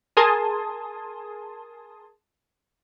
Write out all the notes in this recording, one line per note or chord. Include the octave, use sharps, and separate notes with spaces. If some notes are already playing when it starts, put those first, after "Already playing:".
G#4 A#4 G#5 A5 C6 D#6